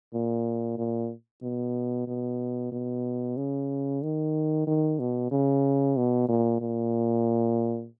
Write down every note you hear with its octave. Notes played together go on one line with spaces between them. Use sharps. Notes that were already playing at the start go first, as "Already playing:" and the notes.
A#2
A#2
B2
B2
B2
C#3
D#3
D#3
B2
C#3
B2
A#2
A#2